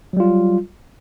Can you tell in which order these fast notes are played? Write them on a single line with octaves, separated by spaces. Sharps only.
F#3 G3 F4